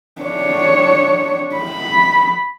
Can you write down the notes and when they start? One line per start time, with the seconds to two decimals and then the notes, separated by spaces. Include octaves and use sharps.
0.22 D4 C#5
1.56 B5